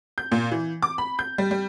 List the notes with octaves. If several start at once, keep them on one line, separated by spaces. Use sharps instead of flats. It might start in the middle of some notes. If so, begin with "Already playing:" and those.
G6
A#2
E3
D6
B5
G6
G3
G3